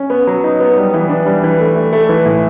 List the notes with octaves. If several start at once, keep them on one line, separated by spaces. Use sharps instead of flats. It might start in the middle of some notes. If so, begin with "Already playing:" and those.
Already playing: C#4
B3
F#3
D#4
B3
G3
E3
D4
G3
E3
A3
A3
A3
E3
A2